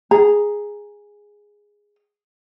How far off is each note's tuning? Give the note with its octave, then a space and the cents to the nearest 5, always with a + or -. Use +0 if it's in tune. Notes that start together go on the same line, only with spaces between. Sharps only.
G#4 -5 A#5 +0